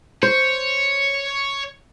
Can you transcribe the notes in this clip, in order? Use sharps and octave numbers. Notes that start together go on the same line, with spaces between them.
C5 C#5